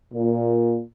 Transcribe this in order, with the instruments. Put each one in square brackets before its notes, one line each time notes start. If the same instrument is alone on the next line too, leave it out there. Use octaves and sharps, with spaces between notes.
[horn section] A#2